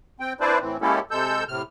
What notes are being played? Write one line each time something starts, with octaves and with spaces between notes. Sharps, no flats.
C4 G5
C4 D4 E4 B4 C5 D5
A2 E3 C4
G#3 A#3 C#4 E4 G4 A4
C3 G#3 A4 E6 G6
A2 C3 F6